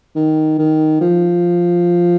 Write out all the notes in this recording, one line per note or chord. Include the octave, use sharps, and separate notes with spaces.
D#3
D#3
F3